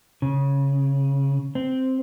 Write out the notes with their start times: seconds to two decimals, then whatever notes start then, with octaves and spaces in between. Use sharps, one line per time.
0.22 C#3
1.55 C4